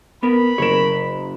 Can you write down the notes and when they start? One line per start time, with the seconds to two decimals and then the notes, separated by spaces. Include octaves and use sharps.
0.23 B3 A#4 B5
0.58 F#1 A#4 C#5 E7